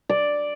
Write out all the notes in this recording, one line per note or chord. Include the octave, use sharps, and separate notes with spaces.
D5